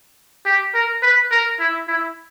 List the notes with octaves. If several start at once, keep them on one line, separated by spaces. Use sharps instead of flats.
G4
A#4
B4
A#4
E4
E4